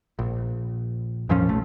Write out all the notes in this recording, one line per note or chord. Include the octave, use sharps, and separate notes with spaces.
A#1
F2 A#2 F3 C#4
B1 A3